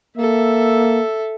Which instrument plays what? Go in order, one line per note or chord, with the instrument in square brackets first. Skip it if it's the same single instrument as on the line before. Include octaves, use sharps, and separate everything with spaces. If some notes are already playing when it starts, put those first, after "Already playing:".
[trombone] A#3 [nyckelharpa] A4 E5